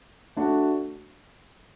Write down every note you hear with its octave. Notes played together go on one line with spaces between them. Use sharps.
A3 D4 F#4